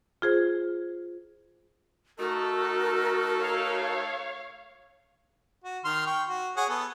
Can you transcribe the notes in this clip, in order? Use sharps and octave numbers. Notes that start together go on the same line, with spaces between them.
F4 G#4 C5
A3 D#4 F#4 A4 A#4
C#5 F5
F#4
D#3 C6 F6
G5 C#6
F#4
G#4 C#5 F#5
B3 A4